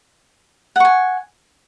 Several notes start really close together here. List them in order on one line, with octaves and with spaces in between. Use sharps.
F#5 C#6 G#5